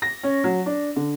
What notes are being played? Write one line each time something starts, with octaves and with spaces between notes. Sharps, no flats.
A#6
C#4
F#3
D4
D3